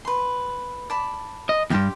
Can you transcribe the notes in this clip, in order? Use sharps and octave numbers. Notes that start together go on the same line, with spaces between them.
B4 C6
D5 A5 B5
D#5
E2 G2 G4 G5 C6